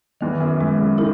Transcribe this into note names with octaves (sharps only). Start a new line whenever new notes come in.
E2 D#3
F#2
F#2 G#3
C#3
D#3 E4